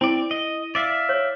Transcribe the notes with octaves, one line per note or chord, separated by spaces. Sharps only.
C4 E4 D5
D#5
D5 E5 F5
C#5